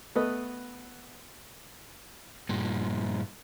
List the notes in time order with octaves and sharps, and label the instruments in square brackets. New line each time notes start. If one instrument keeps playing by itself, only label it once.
[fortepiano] A3 B3 B4 D#5
[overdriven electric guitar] G2 A#2